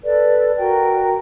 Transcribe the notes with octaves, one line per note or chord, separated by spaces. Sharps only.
A4 B4 D5
F#4 A#4 G5